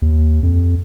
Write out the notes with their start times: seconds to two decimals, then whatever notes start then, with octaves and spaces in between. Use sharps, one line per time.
0.02 D#2
0.43 F2